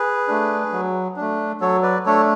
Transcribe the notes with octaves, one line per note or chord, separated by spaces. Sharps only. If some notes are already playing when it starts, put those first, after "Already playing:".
Already playing: G#4 B4
A3 D4
F#3
A3 D4
F#3 A4 C#5
B4 D5
A3 D4 A4 C#5